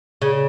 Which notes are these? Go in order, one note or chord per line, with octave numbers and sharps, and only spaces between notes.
C#3